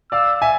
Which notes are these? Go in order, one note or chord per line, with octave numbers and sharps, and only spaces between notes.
D5 F5 E6
E5 G#5